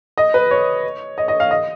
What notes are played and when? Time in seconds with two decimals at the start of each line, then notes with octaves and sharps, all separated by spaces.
0.18 D#5
0.34 B4
0.51 C#5
1.18 D#5
1.28 D#5
1.40 F5
1.51 D#5